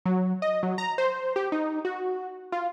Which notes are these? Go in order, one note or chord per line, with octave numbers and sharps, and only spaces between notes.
F#3
D#5
F#3
A#5
C5
G4
D#4
F#4
F4